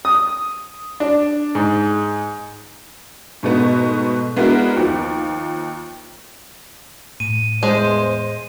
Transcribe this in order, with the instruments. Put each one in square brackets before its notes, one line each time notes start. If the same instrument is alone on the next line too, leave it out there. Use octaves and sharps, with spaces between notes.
[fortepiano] D#6
D4
G#2
[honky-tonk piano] G#2 B2 A3 B3
G#3 B3 D4 E4 F#4 A#4
D#2 F3
[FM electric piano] A2 [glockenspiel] D#7
[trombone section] E2 C5 [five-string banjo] G#3